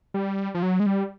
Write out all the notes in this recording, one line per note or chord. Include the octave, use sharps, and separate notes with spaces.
G3
F3
F#3
G#3
G3